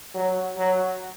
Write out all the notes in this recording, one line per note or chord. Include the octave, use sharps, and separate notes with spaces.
F#3
F#3